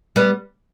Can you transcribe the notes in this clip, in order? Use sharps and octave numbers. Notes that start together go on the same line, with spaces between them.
G3 B3